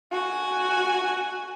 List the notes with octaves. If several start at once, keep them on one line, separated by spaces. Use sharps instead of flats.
F#4 G#5